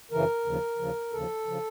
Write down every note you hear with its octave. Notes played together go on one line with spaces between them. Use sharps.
F#2 C#3 E3 A#4
D#2 C#3 F3
D#2 C#3 F3
D#2 C#3 F3 A4
C#3 F3